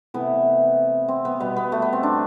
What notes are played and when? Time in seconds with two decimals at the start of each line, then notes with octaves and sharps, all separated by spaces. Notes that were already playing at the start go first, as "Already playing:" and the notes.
0.14 C3 E3 A3 B3
1.08 C4
1.25 B3
1.40 B2 G3 B3
1.57 B3
1.72 A3
1.82 B3
1.93 C4
2.03 D4